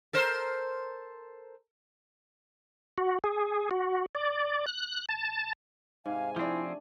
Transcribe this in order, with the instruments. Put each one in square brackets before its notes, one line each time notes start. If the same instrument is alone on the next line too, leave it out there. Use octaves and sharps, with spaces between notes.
[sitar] A4 A#4 C5
[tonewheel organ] F#4
G#4
F#4
D5
F#6
A5
[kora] G#2 [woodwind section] C3 G#5 [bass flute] F5
[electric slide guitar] F3 C4 [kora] A3 D4 [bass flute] E4